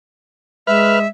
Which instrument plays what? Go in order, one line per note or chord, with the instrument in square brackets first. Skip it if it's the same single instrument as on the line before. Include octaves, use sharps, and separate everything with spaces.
[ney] G#3 [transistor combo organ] B4 F6 [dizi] E5